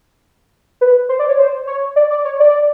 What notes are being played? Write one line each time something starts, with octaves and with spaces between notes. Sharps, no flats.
B4
C5
D5
C#5
C5
C#5
D5
D5
C#5
D5